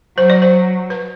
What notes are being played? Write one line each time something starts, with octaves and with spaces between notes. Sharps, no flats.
F#3 C5
D5
C5
B4